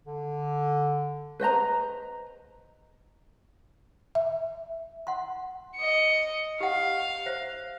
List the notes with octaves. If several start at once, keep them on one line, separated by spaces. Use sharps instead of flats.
D3
B4 C5 D#5 A#5
E5
F#5 C6
D#5 C#7
G4 F5 F#5
C5 E5